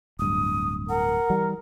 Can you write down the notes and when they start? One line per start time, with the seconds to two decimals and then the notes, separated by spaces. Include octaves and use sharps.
0.19 D1 G2 D#6
0.89 A#4 F#5
1.30 E3 G3